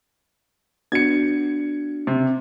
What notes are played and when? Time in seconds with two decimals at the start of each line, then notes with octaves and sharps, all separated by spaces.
0.92 B3 D4 F#4 G#6 C#7
2.07 C3